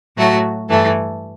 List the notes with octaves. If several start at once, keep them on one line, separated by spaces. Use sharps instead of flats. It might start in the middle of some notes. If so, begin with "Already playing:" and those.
A2 F#3 A3 F#4
G2 E3 A3 A4